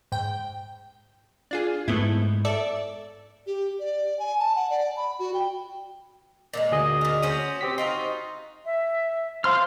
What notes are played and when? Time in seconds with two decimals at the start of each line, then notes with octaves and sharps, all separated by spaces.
0.12 G#2 G5
1.51 D4 F4 G#4
1.88 G#2 A3 B3 E4
2.45 A4 D5 E5
3.47 G4
3.80 D5
4.19 G#5
4.40 A5
4.56 F#5
4.70 D5
4.97 B5
5.19 F#4
5.34 G5
6.54 A#2 F#3 G#3
6.71 D2 G#4 D#5
7.01 A#2 A#4
7.22 C#4 F#4 C5 D#6
7.61 C4 G4 B6
7.78 D#4 F4 F#4 C6
8.65 E5
9.44 C5 F5 C6 F6